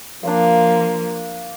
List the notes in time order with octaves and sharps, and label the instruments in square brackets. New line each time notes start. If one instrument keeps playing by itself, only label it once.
[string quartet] F3 A#3 [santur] D4 D5 F5